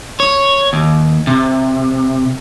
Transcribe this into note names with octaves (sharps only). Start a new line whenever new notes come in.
C#5
D#2
C3